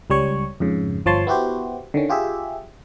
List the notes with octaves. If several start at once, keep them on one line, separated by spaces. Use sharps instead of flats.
C#2 G3 C#5 C#6
F2 G#2 C#3
G1 F3 C#5 A5 C6
B3 E4 F#4 G4 C5
D3 D#3 C#4
F4 G4 G#4 E5